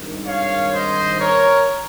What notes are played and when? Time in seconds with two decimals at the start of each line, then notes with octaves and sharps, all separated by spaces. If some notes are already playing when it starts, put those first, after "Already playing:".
Already playing: G#1 G2 D#3
0.26 C#5 F5
0.73 C5 D#5
1.20 A#4 C#5